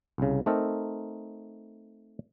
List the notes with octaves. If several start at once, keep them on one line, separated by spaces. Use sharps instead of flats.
C2 C#3
A3 C4 D#4 A4 A#4